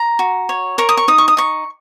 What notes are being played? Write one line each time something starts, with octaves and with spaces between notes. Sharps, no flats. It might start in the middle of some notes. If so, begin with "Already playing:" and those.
Already playing: A#5
F#4
C#5
A#4 C#6
D#6
C#6
D#4 D#6
C#6
D#6
D#4 C#6